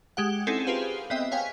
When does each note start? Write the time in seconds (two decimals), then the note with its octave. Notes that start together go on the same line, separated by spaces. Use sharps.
0.17 G#3 G4 F#5
0.47 C4 C#4 D#4 E4 G#4 A4
0.67 F4 G4 G#4 B4 C5 F5
1.10 B3 C4 D#5 E5 G5
1.31 C#5 F5 G5 G#5 B6